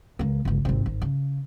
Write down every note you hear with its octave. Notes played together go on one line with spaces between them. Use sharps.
C#2 A#3
G1 C#2
G#1 C3
G#1
C#3